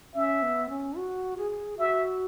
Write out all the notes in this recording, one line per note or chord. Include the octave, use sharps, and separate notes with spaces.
C#4 E5
B3
C#4
F#4
G#4
F#4 E5